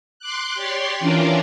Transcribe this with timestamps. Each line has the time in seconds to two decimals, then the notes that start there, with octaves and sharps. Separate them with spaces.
0.19 C6 D6 F#6
0.55 G4 C#5 D5 C6
1.00 E3 C#4 D4 F4 A#4 D5